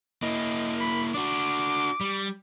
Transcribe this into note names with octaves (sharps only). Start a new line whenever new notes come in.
A#3 E4 D#5
B5
D4 F#4 D6
G3